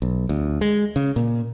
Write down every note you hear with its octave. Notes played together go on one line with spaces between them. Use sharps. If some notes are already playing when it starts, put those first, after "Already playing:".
B1
D2
G#3
C#3
A#2